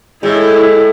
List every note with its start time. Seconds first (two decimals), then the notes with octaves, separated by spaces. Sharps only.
0.23 A2 G#3 E4